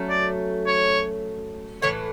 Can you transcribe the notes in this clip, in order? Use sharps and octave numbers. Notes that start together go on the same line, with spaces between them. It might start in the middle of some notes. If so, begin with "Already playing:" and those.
Already playing: F#3 A3 C#4
D5
C#5
A2 E3 A3 C#5